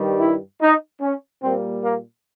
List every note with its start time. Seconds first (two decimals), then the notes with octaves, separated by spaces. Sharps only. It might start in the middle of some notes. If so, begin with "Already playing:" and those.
Already playing: G2 D#3 G3
0.20 E4
0.61 D#4
1.01 C#4
1.42 A#2 G3 A#3 C4
1.82 A#3